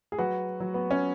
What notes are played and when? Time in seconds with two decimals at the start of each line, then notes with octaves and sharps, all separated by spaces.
0.12 G#4
0.18 F#3 F#4 B4
0.60 F#3
0.74 B3
0.91 C#4